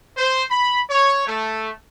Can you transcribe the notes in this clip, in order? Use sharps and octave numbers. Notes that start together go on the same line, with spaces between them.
C5
B5
C#5
A3